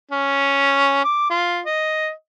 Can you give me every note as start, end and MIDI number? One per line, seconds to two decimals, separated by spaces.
0.11 1.04 61
1.04 1.28 86
1.30 1.60 65
1.66 2.11 75